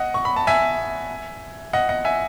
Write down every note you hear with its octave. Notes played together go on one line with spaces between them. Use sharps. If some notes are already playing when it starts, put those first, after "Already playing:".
Already playing: D#5 F#5
C#6
B5
A5
E5 G#5
D#5 F#5
D#5 F#5
E5 G#5